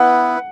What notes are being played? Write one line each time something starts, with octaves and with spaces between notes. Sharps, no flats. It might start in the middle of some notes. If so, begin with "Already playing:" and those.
Already playing: B3 E4 B4 F#5